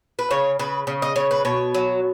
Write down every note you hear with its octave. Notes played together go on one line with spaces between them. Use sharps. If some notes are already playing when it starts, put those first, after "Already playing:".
B4
C#3 C#5
C#3 B4
C#3
D#5
C#3 C#5
B4
B2 C#5
F#3